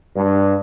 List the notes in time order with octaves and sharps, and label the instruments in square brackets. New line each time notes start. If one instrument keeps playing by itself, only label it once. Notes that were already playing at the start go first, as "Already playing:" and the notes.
[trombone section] G2